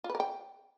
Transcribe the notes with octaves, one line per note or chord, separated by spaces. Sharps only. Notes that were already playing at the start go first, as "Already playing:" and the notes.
F4
B4
A#4
G5